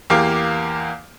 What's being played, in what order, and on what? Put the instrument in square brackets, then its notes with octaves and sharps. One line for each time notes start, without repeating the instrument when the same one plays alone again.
[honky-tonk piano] E2 A#3 G4 F5 D6